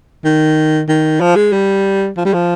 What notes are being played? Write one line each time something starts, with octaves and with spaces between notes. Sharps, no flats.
D#3
D#3
F3
G#3
G3
F3
G3
F3